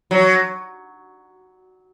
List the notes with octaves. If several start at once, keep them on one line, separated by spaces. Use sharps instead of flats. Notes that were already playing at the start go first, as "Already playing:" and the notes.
F#3